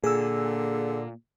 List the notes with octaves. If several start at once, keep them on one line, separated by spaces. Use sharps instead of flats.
A#2 D3 G#4 E6